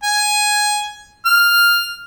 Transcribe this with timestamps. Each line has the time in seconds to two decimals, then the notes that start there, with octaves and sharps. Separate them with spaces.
0.04 G#5
1.26 F6